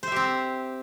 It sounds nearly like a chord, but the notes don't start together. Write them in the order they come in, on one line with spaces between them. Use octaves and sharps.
C5 E5 G4 C4